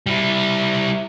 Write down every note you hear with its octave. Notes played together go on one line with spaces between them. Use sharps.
G3 E4